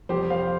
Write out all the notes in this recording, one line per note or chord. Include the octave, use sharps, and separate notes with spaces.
F2 C3 G3 G4 C5
C5 F5